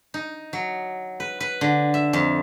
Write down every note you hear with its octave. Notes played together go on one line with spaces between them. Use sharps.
D#4
F#3
B4
B4
D3
E5
F2